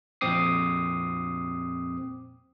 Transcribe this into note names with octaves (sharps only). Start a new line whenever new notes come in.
F2 A#2 C4 D6 D#6 C7